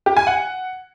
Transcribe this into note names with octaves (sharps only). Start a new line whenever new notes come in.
G4
G#5
F#5